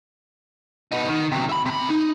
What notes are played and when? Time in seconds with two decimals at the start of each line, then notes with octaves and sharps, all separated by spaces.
0.92 B3 D#4
1.08 D#3
1.32 C3 F#3
1.49 E5 B5
1.66 C3 B5
1.90 D#4